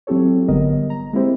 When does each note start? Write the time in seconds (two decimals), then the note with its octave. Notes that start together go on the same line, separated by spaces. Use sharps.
0.07 F#3 C4 E4 G4 A4 C#5
0.48 G#1 D3 G3 B3 A#4 D#5
0.90 A#5
1.13 G#3 A#3 C4 E4 G4 C5